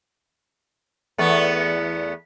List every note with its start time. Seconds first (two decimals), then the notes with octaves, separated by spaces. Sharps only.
1.18 E2 A3 B3